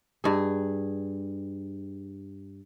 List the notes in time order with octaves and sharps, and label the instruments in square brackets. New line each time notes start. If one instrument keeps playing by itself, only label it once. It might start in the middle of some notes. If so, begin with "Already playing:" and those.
[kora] G2 G#4